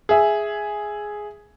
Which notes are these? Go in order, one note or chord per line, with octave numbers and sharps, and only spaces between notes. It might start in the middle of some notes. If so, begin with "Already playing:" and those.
G#4 E5